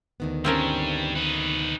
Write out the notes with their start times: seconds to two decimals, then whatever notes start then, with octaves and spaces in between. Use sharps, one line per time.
0.20 D2 D#3 B3
0.45 G2 G3 C4 C#4 A#4
1.15 D#4 B4